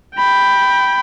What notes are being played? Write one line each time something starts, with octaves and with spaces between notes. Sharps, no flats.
G5 B5